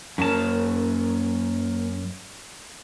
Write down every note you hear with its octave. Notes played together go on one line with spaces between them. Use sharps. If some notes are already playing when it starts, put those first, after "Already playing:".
F#2 A#3 C#4 A5